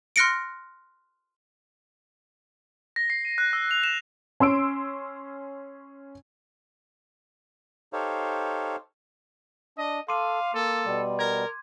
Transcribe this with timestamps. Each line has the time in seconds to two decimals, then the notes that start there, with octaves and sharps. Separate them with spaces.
0.16 C6 F6 F#6 A#6 C#7 D7
2.96 A#6
3.10 C7
3.25 D#7
3.38 F#6
3.53 E6
3.71 F7
3.84 E7
4.40 C#4 C6 E6 D7
7.93 D#4 G4 A4 C5 C#5 F5
9.78 D4 D#5
10.09 A4 F5 C6 D6 D#7
10.54 A#3 A4
10.85 B2 G3
11.19 A#4 G#6